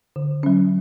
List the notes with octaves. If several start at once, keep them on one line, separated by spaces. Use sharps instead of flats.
D3
F#3 C#4